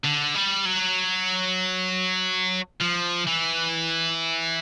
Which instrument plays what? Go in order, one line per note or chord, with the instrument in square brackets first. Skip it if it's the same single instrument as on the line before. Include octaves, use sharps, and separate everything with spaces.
[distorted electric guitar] D3
G3
F#3
F3
E3